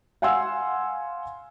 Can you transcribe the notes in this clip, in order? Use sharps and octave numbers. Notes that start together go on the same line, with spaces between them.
F5 F#5 G#5 C6 E6